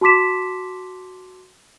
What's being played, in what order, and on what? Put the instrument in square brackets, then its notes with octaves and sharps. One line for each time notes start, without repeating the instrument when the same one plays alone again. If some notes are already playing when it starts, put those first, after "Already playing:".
[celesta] F#4 A5 C6 D6 B6 E7